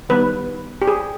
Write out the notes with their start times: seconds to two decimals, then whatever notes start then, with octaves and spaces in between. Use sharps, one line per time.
0.09 D#3 G3 B3 B4
0.82 G4
0.88 G#4